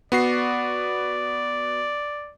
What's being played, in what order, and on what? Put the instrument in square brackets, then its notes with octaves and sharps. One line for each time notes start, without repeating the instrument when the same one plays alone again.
[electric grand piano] B3 F#4 C7 [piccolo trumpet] D5